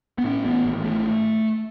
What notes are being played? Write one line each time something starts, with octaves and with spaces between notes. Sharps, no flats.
B3
A2 C#4
A1 B3
G#1
G#1 A3